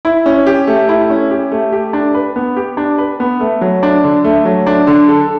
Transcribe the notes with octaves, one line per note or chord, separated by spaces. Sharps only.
E4
C#4
G4
A3
E4
C#4
G4
A3
G4
D4
B4
B3
G4
D4
B4
B3
A3
F#3
D4
D3
A3
F#3
D4
D3
A4